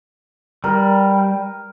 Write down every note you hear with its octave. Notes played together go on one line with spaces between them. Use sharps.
G3 A#4 B4